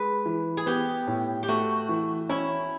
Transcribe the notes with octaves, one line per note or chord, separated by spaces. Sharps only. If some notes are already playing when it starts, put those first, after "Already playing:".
Already playing: G#3 B4
E3
G#4
B3 G4
A2
G4
A3 F#4
E3
C#4 E4